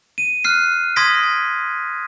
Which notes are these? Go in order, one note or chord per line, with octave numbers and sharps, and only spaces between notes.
D#7
F6 F#6 C7
C6 D#6 G#6 A#6 B6 D7